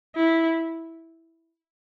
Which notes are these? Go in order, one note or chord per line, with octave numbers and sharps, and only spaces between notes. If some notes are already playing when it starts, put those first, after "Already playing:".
E4